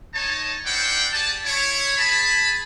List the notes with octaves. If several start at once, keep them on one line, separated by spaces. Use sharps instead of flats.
D#4 C#5 A5
D4 E4 C5 D5 F#5 G5
G4 G#4 D5 A5
E4 C#5
G#4 A5 B5